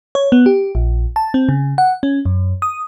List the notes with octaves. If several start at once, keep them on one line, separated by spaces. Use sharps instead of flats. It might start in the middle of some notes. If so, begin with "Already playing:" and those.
C#5
B3
G4
A#1
A5
C4
C#3
F#5
C#4
F#2
D#6